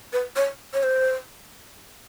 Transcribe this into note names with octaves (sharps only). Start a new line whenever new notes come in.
B4
C#5
C#5
C5